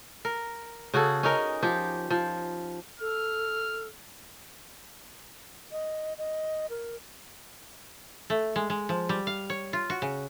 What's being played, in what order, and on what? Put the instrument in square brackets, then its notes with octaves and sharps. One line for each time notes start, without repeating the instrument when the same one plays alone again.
[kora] A#4
C#3 F#4 G#4 A4
C#4 D#4 A#4
F3 G4
F3
[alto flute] A4 [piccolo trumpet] F6
[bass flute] D#5
D#5
A#4
[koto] A3
G#3
G#3
F3
G3
F5
C#5
F4
F#4
C#3